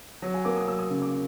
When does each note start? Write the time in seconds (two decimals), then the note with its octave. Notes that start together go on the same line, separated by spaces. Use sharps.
0.22 F#3
0.34 G#5
0.45 A#3 D6
0.56 D#6
0.68 F#3 E6
0.79 D#6
0.90 C#3
1.02 D6